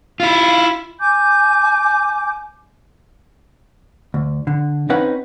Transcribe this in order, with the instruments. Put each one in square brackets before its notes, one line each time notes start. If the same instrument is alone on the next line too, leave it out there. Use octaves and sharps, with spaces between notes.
[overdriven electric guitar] E4 F4
[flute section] G#5 D6 G6
[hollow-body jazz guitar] D2
D3
C4 C#4 D#4 B4 F#5